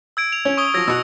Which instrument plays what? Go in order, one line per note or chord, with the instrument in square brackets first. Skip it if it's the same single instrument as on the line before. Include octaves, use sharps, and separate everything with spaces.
[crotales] E6 G#6 D7
F7
[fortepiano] C#4
[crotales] C#6 D#6 G7
[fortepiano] F3 F#3 [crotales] E6 G#6 A#6
[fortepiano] B2 F#4 F#6 [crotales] E6